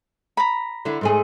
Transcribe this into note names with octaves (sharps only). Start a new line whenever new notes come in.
A#5 B5
D3 E4
G#2 A3 G#4